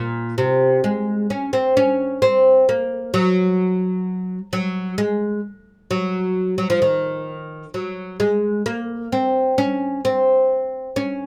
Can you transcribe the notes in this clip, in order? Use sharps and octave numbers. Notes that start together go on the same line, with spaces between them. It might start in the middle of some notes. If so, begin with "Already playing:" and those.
Already playing: A#2
C3
G#3
C#4
C4
C#4
C4
A#3
F#3
F#3
G#3
F#3
F#3
F3
D#3
F#3
G#3
A#3
C4
C#4
C4
C#4